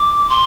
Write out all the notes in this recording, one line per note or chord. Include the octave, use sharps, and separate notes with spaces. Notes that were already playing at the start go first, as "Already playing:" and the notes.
Already playing: D6
C6